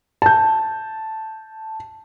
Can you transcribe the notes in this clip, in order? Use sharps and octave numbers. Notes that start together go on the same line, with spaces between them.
A5 G6